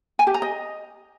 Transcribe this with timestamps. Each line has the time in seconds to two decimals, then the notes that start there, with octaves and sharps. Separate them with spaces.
0.19 G#5
0.27 G4
0.34 A#5
0.42 D#5